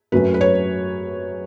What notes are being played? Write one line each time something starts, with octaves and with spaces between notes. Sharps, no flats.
F#2 F#3 A3 C#4 B4
B4
C#5